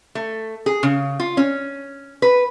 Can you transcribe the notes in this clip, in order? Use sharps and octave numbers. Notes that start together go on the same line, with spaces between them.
A3
G#4
C#3
F4
C#4
B4